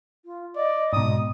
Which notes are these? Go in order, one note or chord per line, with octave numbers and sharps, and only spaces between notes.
F4
D5 D#5
G#2 B2 D#6